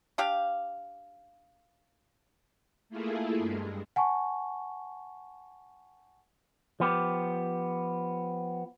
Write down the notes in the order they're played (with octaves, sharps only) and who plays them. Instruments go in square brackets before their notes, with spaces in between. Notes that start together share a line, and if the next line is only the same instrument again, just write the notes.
[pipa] D4 G4 F5
[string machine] A3 A#3 E4 F4 G#4 A4
G2 G#3
[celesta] F#5 G#5 A5 C#6
[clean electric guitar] F3 B3 G4